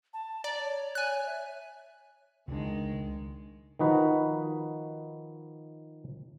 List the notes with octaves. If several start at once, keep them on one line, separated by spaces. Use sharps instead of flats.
A5
D5 A#5
C#5
G#5 F#6
E5
C#2 D#3 G#3 D4
D#3 F3 D#4 F#4 B4